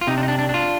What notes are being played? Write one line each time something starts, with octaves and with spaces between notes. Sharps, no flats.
F4
C3 D#4
D4
D#4
D4
D4
D4 F4